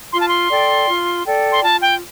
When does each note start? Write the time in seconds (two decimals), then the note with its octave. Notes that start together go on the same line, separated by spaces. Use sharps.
0.13 F4 C6
0.20 A5
0.28 C6
0.50 A4 D5 G5
0.88 F4
1.25 A4 D5 G5
1.52 C6
1.63 F4 A5
1.82 G5